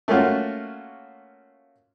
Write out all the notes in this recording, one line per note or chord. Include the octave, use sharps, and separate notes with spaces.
A3 A#3 C#4 F4 F#4